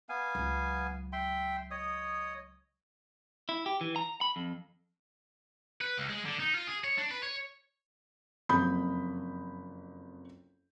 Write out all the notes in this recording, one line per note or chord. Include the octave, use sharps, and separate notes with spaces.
B3 F5 G#5
C#2 F#3
E5 G5 C6
C#5 D#5 D#6
E4
G4
E3
A#5
B5
F2
B4
C#2
G#3
D3
D#4
F4
G#4
C#5
D4
B4
C#5
F#1 F2 B5 D#6 G6